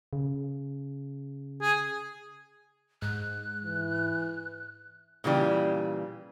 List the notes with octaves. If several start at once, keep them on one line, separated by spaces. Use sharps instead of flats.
C#3
G#4
G#2 F#6
E3
A#2 C#3 E3 G3